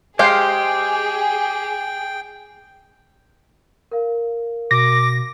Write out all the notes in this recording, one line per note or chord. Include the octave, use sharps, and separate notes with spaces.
G#3 G4 G#4 C5 F5 G5
A#4 F5
B2 D6 A#6